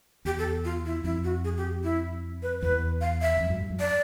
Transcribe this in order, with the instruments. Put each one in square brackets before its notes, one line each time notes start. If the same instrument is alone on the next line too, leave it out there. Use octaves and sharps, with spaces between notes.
[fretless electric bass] E2 [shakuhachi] G4
[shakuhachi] A4
F4
E4
[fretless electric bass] F2 [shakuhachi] E4
[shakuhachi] F#4
G#4
G4
E4
B4
[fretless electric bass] E2 [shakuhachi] B4
[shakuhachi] F5
E5
[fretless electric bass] E2
F2
F#2
G2
F#2
[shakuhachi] D5